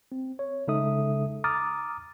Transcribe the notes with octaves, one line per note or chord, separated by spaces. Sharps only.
C4
C#5
C#3 G#3 D#4 A4 E5 D#6
A#5 D6 D#6 F6 A6